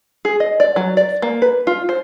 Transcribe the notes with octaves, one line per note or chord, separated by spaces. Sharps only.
G#4
D#5
D5
F#3
D5
A#3
B4
F4
C5